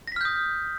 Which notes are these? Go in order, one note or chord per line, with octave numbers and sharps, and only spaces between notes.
D#6 F6 G6 A#6 B6